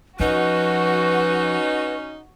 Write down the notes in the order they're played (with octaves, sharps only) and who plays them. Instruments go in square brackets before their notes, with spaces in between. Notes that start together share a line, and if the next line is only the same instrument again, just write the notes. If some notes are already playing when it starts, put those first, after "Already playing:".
[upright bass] F3 [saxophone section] C#4 D#4 [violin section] F#4 [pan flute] B4